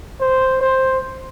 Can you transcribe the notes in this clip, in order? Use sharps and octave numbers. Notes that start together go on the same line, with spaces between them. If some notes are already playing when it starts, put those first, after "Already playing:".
C5
C5